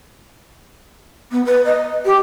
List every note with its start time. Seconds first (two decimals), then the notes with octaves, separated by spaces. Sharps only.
1.31 B3
1.45 B4
1.65 D#5
2.05 G4